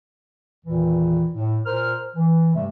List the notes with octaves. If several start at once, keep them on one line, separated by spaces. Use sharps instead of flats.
E2 A#2 D#3 E3
A2
A#2 A#4 C5 F6
E3
G2 C3 G3 A3